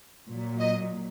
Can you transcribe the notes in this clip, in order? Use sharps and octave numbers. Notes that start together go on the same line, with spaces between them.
A#2 F#3
D#5